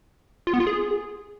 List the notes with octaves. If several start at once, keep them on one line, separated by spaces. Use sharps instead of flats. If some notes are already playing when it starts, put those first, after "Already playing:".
F4
B3
F4
G#4